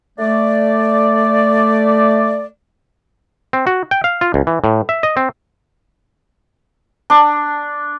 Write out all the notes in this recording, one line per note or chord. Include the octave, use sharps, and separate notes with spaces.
A3 D5
C4
F#4
G5
F5
F4
C#2
E3
A2
E5
D#5
C4
D4